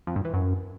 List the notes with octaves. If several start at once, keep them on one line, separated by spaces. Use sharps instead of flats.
F2
G2
E3
F#2